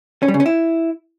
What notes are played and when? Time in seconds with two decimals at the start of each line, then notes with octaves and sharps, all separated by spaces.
0.23 C#4
0.28 G3
0.34 C#3
0.40 C#4
0.46 E4